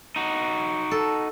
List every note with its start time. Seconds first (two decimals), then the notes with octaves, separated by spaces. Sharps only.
0.16 D#4 F#4
0.91 A4